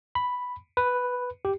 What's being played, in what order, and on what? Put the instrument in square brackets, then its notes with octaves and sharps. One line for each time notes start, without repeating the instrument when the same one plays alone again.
[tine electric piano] B5
B4
G4